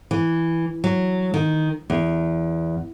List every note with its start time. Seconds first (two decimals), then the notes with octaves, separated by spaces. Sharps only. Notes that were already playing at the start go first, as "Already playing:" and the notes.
0.11 E3
0.84 F#3
1.34 D#3
1.90 E2